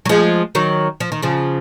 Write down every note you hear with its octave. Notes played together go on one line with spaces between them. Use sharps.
F#3
F3 G#3
D#3 F#3
F3
D#3
C#3 F3